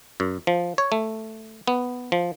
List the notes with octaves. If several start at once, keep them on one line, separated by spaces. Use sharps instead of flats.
F#2
F3
C#5
A3
B3
F3